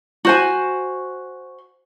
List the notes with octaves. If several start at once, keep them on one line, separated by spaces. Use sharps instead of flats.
F#4 C5 G#5